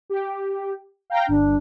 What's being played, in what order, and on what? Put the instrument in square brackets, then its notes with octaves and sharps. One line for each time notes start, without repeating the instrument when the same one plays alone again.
[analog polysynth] G4
F5 G5 A#5
[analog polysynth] G1 [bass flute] D4